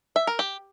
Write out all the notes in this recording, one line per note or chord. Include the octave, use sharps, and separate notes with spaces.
E5
A#4
G4